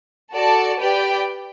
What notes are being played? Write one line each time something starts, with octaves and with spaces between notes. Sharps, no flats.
F#4 A4 D5 A5
G4 B4 D5 G5